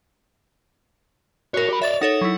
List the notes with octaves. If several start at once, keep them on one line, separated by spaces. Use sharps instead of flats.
F#4 A4 A#4 C#5
G4 B5
C#5 D5 E5 A6 F7
D#4 A4 C#5 F#5
F#3 E4